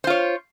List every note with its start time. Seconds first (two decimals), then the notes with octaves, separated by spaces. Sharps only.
0.04 C5
0.07 F4
0.10 C#5